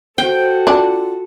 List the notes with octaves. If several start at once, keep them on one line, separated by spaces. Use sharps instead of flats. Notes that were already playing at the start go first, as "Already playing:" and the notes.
F#4 A4 C5 G5
D4 F4